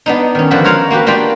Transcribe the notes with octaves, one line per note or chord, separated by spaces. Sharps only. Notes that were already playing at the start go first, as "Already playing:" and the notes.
B3 D4 D#4
D#3 C#4
D3 F3 F#4 B4 B5
A#4 C5 C#5 F5 F#5 A#5
A#3 F#4 G4 B4
A#3 D4 F4 G5 B5